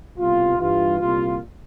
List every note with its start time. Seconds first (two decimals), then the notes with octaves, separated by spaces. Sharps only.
0.18 C2 B2 G3 F4
0.58 G2 E3 G3 F4
0.98 C2 A#2 G3 F4